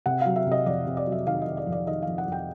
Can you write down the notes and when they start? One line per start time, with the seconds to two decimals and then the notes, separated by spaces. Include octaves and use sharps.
0.06 C3 F#5
0.21 F#3 F5
0.36 E5
0.47 C3
0.52 D#5
0.66 F2 D5
0.87 C3
0.97 D5
1.07 F#3 E5
1.27 D#3 F5
1.42 D#5
1.47 D#3
1.57 D5
1.67 F2
1.72 D5
1.87 D#3 D#5
2.02 F2 F5
2.18 F#5
2.28 F2 G5